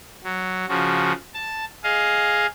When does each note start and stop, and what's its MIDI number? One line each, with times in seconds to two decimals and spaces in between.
0.24 0.66 54
0.68 1.12 49
0.68 1.12 53
0.68 1.12 66
1.34 1.65 81
1.84 2.46 68
1.84 2.46 75
1.84 2.46 77